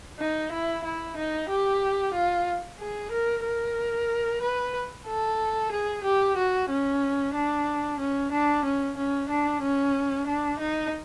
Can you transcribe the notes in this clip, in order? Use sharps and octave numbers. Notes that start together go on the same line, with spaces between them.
D#4
E4
E4
D#4
G4
F4
G#4
A#4
A#4
B4
A4
G#4
G4
F#4
C#4
D4
C#4
D4
C#4
C#4
D4
C#4
D4
D#4